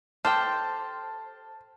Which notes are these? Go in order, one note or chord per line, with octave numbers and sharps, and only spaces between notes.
G4 A4 C5 G5 A5 F6